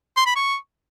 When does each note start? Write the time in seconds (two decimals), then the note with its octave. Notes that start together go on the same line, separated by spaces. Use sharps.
0.17 C6
0.26 B5
0.36 C#6